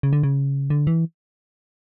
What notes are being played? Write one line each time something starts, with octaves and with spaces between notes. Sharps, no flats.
C#3
D3
C#3
D3
E3